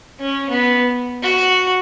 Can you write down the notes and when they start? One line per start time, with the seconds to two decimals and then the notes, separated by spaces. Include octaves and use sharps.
0.20 C#4
0.49 B3
1.22 F#4